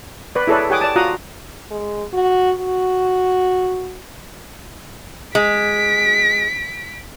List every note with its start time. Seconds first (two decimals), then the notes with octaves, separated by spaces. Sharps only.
0.35 B4 D5
0.47 E4 G#4 A4 B4 C#5 D5
0.70 G4 C#5 F#5 G#5 D6 D#6
0.81 D5 A5
0.96 F4 F#4 F#5 A#5 D#6
1.71 G#3
2.13 F#4
2.58 F#4
5.35 G#3 B6 D7